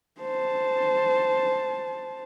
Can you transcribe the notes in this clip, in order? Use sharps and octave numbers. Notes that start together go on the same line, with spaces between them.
C5 A5